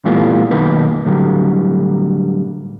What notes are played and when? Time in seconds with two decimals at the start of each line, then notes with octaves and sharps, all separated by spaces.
0.05 A#2 E3 G3 A3 B3 F4
0.51 F#2 B2 D#3 A#3 D#4 B4
1.05 A2 D3 F#3 G3